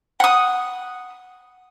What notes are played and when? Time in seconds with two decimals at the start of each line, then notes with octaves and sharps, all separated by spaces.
0.20 F#5 D#6